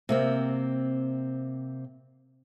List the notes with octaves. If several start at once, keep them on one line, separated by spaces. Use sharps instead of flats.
C3 A#3 C4